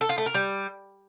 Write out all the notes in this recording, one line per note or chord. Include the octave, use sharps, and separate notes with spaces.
A4
F4
A3
A#4
G3